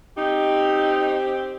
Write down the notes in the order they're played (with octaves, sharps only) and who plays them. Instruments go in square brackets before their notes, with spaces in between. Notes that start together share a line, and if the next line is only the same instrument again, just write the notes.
[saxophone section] C4 G4 [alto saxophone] D#4